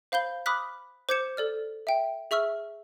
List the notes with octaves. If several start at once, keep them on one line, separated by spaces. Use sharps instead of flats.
C5 F5 B5 G6 G7
B5 D6 D#6 F6 F#6 B6
C5 D6 G6 G#6 C#7 E7
A4 D5 F6
E5 G5
G#4 E5 C#6 E6 F6